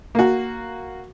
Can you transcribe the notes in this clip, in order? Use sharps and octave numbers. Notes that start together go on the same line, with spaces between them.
A#3 F#4